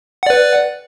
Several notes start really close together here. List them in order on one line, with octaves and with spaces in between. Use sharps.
F#5 D5 B4